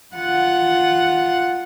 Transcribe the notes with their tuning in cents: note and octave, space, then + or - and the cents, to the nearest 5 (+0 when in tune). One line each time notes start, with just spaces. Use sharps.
F4 +0 F#5 +0